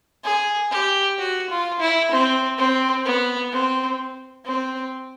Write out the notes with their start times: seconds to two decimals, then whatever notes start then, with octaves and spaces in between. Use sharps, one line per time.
0.24 G#4
0.71 G4
1.18 F#4
1.50 F4
1.80 E4
2.11 C4
2.58 C4
3.05 B3
3.52 C4
4.45 C4